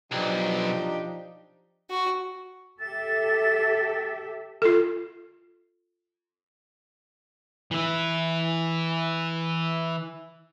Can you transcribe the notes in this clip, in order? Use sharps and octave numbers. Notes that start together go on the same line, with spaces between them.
B1 F3 D4 D#4 G4
F#4
G4 A4 E5 A6
F4 A4
E3 E4